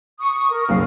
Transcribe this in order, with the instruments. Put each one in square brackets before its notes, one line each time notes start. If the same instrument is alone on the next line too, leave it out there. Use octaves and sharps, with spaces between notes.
[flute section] C#6 D#6
A#4
[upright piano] F#1 B1 [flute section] F5